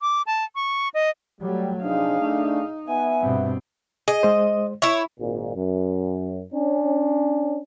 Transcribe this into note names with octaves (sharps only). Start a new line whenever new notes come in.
D6
A5
C#6
D#5
F#3 G3 A3
C3 F3 D4 D#4 G#4 F5
A3 D4
B3 E5 G#5
G2 B2 C4
G#4 D#5
G#3 C5
E4 C#5 E5
G#1 A#2
F#2
C#4 D4